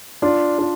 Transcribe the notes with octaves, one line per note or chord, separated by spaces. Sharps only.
D4 F4
D4 F4